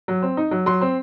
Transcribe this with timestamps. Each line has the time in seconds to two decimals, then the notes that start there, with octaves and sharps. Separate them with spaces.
0.08 F#3
0.22 C4
0.37 D#4
0.51 F#3
0.66 F#3 C6
0.81 C4